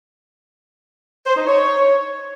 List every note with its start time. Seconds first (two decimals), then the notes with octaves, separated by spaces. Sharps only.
1.26 C5
1.37 D#4
1.47 C#5